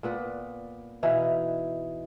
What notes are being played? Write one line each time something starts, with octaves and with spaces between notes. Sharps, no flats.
A#2 B3 B4 D5
B2 E3 D#4 F5